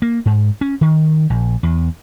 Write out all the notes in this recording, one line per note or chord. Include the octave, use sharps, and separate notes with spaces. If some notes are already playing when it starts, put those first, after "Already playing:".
A#3
G#2
C#4
D#3
A#1
E2